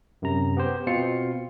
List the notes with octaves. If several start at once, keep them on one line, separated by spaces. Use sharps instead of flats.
F#2 C3 A#5
B3 G4 C5
B2 C4 F4 C7 C#7